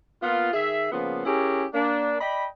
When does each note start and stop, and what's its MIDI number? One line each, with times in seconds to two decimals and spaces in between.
0.23 0.50 58
0.23 0.50 59
0.23 0.50 65
0.53 0.91 51
0.53 0.91 68
0.53 0.91 76
0.92 1.24 49
0.92 1.24 53
0.92 1.24 58
0.92 1.24 59
1.25 1.65 61
1.25 1.65 64
1.25 1.65 67
1.25 1.65 68
1.25 1.65 70
1.74 2.16 58
1.74 2.16 62
2.21 2.46 74
2.21 2.46 75
2.21 2.46 79
2.21 2.46 83